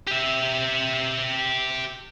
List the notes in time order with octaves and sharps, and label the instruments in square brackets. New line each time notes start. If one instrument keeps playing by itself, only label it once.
[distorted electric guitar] G4 E5